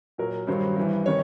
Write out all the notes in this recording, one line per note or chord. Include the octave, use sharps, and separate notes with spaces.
A#2 F#3 A#4
G2 D#3 F#3 C5
G2 E3
C3 D#3 C#5